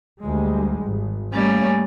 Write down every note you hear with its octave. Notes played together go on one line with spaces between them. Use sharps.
D2 G3 G#3
G#1
G3 A3 A#3 C#4